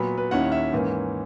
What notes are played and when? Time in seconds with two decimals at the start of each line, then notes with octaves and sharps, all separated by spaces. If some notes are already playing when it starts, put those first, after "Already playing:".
Already playing: A#2 F#3 B3 B5
0.18 B4
0.31 D#2 D#3 A#3 C#4 E4 F#5
0.52 E5
0.72 G#2 E3 A#3 C#4